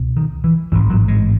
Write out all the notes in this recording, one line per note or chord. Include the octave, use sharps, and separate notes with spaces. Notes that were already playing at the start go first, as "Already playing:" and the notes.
Already playing: C#2 B2
D#3
E3
A1 G#2 E3
F#3
G#3